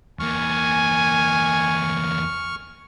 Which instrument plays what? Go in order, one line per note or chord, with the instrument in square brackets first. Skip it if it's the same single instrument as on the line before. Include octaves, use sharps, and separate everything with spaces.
[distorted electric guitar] E2 A#3 [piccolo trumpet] G#5 [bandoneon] C#6 F6